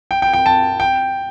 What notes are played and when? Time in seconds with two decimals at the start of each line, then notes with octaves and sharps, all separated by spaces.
0.11 G5
0.22 G5
0.33 G5
0.46 A5
0.80 G5